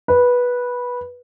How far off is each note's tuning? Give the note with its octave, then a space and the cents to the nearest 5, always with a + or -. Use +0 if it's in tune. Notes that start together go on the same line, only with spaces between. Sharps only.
B4 -10